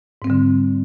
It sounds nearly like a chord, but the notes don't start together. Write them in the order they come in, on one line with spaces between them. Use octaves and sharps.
G#2 C4 G3 D3